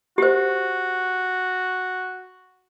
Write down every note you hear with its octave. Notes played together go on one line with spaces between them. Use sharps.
F#4 G4 C5